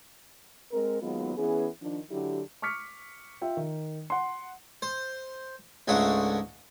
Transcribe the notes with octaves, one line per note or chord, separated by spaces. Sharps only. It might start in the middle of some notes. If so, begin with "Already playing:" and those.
G#3 C4 A#4
D#2 F#3 G#3 B3 F4
E3 B3 C#4 G#4
D#3 F3 D4
D3 F#3 E4 G4
C#6 D6 F6 B6 C#7
F4 E5 G5
D#3
F#5 C6
C5
C#2 G#2 G#3 A3 D4 F#5